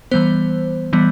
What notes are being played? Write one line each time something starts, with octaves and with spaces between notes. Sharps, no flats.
E3 G3 B3 C5
E3 G3 B3